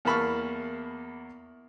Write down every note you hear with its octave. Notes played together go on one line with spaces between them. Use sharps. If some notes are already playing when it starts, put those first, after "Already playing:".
E2 A#3 A5 B5 C#6 F6